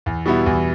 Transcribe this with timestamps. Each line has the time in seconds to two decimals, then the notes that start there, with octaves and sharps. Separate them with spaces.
0.06 E2
0.26 B2 G3 B3 E4
0.46 E2